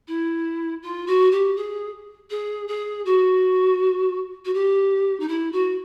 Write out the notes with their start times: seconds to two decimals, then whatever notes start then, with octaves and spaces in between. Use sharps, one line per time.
0.07 E4
0.82 F4
1.07 F#4
1.31 G4
1.56 G#4
2.30 G#4
2.68 G#4
3.05 F#4
4.45 F#4
4.54 G4
5.20 D#4
5.28 E4
5.52 F#4